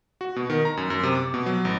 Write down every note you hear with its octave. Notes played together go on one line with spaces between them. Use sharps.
F#4
B2
D#3
A#5
F#2
F#2
C3
D6
B2
F#3
A1